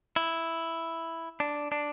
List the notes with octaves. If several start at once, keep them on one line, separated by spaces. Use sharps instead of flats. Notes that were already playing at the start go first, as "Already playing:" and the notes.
E4
D4
D4